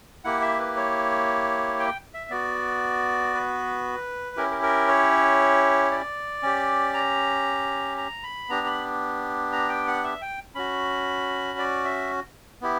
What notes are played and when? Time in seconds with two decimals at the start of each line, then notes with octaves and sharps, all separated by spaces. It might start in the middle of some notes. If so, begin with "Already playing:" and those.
0.24 A#3 E4 G4 F#5
0.41 E5
0.59 B4
0.76 C#5
1.79 G5
2.14 E5
2.30 B3 F#4 D5
3.34 B4
4.36 C#4 E4 G4 A#4
4.51 A#4
4.63 A#4
4.88 C#5
5.91 D5
6.43 C#4 G4
6.94 A#5
7.97 A#5
8.23 B5
8.49 B3 D4 G4 A#5
8.66 B5
9.52 A#5
9.69 G5
9.87 F#5
10.04 E5
10.22 G5
10.55 C#4 F#4 B5
11.59 D5
11.85 E5
12.61 B3 E4 G4